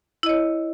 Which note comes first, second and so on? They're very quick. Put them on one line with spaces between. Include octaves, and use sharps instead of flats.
E4 D#5 C#5